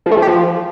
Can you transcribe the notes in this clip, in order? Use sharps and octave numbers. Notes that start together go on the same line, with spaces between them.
F3
A3
F3
G4
F3